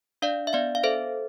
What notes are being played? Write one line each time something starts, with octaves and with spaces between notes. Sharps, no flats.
D4 D5 F5
E5
B3 D5 F5
F5
A4 C5 E5